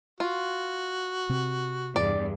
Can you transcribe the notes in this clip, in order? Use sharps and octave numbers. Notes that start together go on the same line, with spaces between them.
F4 F#4
C3 C4
E2 G2 D5